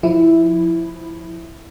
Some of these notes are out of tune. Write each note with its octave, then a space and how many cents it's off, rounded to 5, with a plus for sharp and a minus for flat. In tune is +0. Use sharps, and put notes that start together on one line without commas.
F3 +0 E4 +0